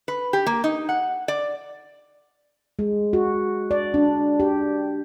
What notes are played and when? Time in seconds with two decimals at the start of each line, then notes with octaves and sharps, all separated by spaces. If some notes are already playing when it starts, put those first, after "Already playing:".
0.08 B4
0.33 G4
0.46 A#3
0.64 D#4
0.89 F#5
1.28 D5
2.79 G#3
3.13 F#4
3.71 D5
3.94 D4
4.40 G4